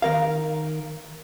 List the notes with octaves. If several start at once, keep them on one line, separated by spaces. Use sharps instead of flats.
D#3 A#4 F5